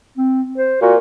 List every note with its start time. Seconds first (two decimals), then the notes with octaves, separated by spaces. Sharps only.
0.17 C4
0.57 C5
0.82 A#2 F#4